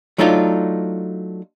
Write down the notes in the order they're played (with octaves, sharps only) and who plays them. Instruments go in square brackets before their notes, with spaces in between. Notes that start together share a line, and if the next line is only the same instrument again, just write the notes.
[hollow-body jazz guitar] F#3 A3 D4 D#4 F4